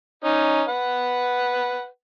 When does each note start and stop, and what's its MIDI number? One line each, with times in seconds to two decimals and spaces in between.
0.24 0.63 61
0.24 0.63 63
0.69 1.87 71
0.69 1.87 78